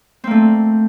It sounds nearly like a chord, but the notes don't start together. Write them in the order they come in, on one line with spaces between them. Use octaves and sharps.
C4 A#3 A3